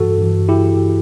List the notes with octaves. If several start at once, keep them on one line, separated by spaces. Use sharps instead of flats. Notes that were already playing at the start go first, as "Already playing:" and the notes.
Already playing: G2 E3 F#4 A4
G2 E3
E4 G4